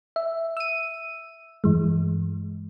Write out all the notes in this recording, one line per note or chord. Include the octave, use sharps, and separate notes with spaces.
E5
E6 D#7
G2 E3 G#3